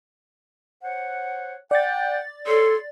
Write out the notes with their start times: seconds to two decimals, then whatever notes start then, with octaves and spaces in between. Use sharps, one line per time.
0.84 C5 C#5 F#5
1.71 D5 F#5 G5 A6
2.47 A4 C#5 C6